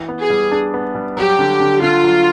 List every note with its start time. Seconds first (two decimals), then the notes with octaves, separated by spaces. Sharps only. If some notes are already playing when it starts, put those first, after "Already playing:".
Already playing: E3
0.08 B3
0.20 G#4
0.30 G3
0.52 D4
0.74 B3
0.95 G3
1.17 F#3 G4
1.39 D3
1.60 D3
1.82 D3 F4
2.04 F#3